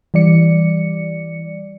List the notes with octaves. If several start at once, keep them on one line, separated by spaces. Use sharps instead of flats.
E3 G3 D5 C#7